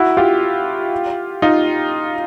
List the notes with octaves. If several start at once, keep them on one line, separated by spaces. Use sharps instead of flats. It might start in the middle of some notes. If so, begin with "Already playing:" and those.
Already playing: E4 F#4
F4 G4
D#4 F4